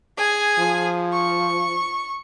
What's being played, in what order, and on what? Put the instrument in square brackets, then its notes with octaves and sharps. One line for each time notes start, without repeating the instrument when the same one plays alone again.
[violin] G#4 G#5
[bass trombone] F3
[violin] C#6